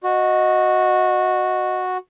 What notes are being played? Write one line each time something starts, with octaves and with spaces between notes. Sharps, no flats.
F#4 D#5